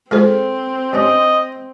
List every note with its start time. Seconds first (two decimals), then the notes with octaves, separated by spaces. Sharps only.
0.11 G#2 G#3 C4 F4 A4 C5
0.93 G2 G3 C#4 D#5